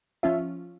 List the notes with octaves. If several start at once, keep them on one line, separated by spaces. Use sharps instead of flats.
F3 C#4 F4 E5